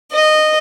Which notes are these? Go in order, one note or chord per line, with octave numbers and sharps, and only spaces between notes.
D#5